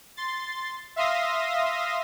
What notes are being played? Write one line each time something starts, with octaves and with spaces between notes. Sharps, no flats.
C6 A6
E5 F5 C6 D#6 A#6